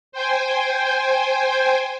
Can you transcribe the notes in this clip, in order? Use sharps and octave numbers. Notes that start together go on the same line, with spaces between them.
C5 G5 G#5